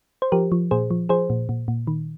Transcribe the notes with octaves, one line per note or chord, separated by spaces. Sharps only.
C5
F3 G4 A#4
F3
A#2 G#4 C5
F3
F3 G#4 C5
A#2
A#2
A#2
D#3